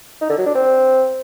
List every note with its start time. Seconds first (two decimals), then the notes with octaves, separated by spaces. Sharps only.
0.21 D#4
0.29 D3
0.38 F#3
0.46 D4
0.55 C4